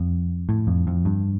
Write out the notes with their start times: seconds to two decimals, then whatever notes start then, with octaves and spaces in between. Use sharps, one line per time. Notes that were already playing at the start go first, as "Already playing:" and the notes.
Already playing: F2
0.49 A2
0.67 F2
0.87 F2
1.05 G2